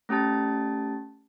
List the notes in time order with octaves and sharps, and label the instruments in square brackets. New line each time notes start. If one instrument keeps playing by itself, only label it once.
[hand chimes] A3 C#4 G4 A5 A6